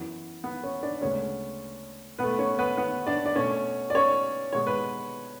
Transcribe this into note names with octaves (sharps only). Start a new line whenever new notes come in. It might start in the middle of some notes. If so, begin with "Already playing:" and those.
Already playing: F#2 E3 B3
B3 B4
C#4 C#5
D4 D5
D2 C#3 G#3 B3 C#4 C#5
B2 A3 B3 B4
C#4 C#5
B3 B4
B3 B4
D4 D5
D5
B2 A3 C#4 C#5
D5
C#4 C#5
B2 G#3 B3 C#5
B4